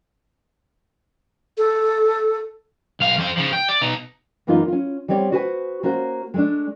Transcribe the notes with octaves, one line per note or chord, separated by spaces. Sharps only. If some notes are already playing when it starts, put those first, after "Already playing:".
A4
B1 F5
F2 C5
C#3 F3
G5
D5
B2 D#4
F#2 E3 A#3 B3 D#4 F4
C#4 F4
G3 B3 C4 C#5 D5
F#4 G#4 B4 C5 G#5
A#3 C#4 F#4 C5
G#3 A3 D4